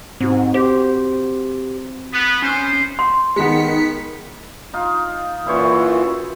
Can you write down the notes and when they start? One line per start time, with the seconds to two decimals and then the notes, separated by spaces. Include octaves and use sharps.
0.20 G#2 C4 F#4
0.54 G4 C5
2.13 B3
2.42 B3 C#4 C5 C6
2.99 C6
3.36 D#3 G#3 B3 B6 C#7
4.73 D#4 F4
5.46 F#2 A#2 E3 E4 C5 C#5